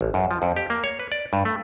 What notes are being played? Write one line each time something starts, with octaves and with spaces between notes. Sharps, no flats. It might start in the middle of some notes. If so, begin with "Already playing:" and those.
A1
F#2
F3
F2
G4
A#3
C#5
B4
D5
G2
A3